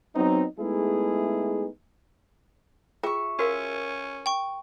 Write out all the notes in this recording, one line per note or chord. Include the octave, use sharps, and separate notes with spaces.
F#3 B3 C4 D#4
G#3 A3 B3 D#4 E4 G#4
F4 G#4 E5 G5 C#6
C#4 F#4 A#4 F5
G5 C#6